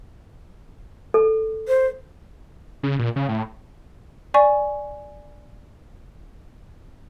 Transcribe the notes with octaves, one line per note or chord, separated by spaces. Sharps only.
A4
C5
C#3
A#2
C#3
A2
D5 G#5 C#6